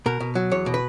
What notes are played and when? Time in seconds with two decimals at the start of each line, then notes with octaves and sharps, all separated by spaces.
0.06 B2 A#4
0.20 B2
0.35 F#3
0.51 E2 C#5
0.66 B2
0.74 B4